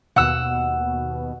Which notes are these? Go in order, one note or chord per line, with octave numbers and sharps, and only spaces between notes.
D#2 B2 F#5 E6